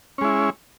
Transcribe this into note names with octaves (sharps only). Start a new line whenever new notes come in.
G#3 C#4 E4